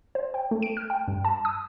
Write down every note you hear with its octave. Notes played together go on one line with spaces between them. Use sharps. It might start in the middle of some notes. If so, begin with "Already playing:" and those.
C5
G5
A3
D7
F6
G5
G2
A5
D#6